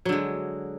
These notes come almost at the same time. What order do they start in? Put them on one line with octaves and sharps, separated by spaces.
F#3 D3 G#3